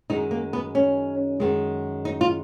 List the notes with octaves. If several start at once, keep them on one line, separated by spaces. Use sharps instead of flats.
F#2 D#3 G#3 D#4
A#3
B3
C#4
F#2 D#3 G#3
D#4
F4